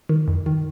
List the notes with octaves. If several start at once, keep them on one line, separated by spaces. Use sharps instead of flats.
D#3
F2
D#3